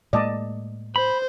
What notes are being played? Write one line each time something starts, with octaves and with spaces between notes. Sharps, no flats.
A2 G#3 A#3 D5 D#5 A5
C5 B5